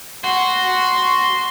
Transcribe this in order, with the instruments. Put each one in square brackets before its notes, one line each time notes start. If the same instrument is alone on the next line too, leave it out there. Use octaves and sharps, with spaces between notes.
[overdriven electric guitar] F#4 [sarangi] C6